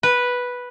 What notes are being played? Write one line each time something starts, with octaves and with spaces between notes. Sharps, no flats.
B4